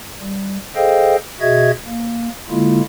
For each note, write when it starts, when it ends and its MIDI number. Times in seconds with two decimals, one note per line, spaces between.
0.20 0.58 55
0.76 1.16 68
0.76 1.16 69
0.76 1.16 72
0.76 1.16 75
0.76 1.16 77
0.76 1.16 79
1.41 1.71 47
1.41 1.71 66
1.41 1.71 68
1.41 1.71 75
1.41 1.71 76
1.41 1.71 92
1.86 2.29 58
2.50 2.81 50
2.50 2.81 56
2.50 2.81 58
2.50 2.81 64
2.50 2.81 65